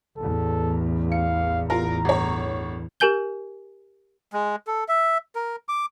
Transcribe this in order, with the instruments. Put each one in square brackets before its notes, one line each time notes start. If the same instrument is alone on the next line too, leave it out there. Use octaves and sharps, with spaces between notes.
[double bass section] A1 E2 [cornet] A4
[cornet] F5 [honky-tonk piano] C#7
[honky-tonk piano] F4 A#4 [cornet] A#5
[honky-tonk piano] G1 C#5
[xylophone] G4 A#4 G#5 G6 G7
[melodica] G#3
A4
E5
A#4
D6